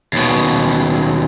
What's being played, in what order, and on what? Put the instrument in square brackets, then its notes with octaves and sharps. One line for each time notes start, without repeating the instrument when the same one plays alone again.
[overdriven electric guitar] D#2 B2